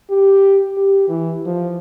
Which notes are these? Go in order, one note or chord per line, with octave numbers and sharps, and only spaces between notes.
G4
G4
E3
F3